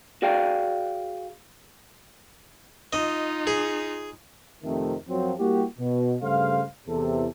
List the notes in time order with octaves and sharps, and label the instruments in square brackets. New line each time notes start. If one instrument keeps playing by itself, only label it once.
[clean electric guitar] F#4 G#4 D5 F5 G5
[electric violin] D#4 F4 [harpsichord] D#5
[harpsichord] G#4
[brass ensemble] F2 C3 D#3 A3
F#2 F3 F#3 C4
G3 A#3 E4 F#4 G4
B2
G2 C#3 A3 C5 F5
E2 C3 A4